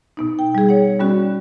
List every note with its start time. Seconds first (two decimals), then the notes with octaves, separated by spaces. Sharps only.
0.17 B2 B3 D#4
0.39 G5
0.55 G3 G#4
0.69 C#5 F#5
0.99 G3 B3 C#4 F#4 D5